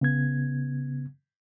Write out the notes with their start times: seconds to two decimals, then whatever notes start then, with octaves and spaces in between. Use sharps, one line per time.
0.01 C#3 B3 G#6